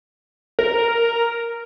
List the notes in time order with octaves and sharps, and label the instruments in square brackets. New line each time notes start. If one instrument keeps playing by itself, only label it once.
[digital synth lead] A#4